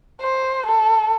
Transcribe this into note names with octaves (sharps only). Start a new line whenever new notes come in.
C5
A4